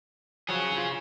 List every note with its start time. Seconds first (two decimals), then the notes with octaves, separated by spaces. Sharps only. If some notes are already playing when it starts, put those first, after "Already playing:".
0.48 F3 F#3 G#4 C#5
0.78 F4